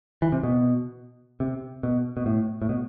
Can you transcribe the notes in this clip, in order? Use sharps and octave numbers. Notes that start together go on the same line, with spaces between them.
E3
C3
B2
C3
B2
B2
A2
A2
B2